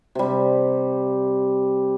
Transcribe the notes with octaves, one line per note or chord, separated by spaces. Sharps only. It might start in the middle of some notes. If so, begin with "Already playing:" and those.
C3 G3